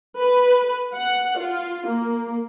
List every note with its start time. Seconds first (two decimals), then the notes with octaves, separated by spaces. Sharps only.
0.18 B4
0.94 F#5
1.38 F4
1.87 A#3